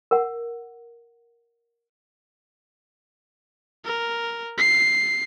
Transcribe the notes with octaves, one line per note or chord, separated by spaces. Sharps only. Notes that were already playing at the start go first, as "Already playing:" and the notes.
A#4 F#5
A#4
C7